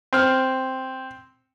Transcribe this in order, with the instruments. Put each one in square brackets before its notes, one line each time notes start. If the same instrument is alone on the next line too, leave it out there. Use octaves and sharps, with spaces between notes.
[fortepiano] C4 F6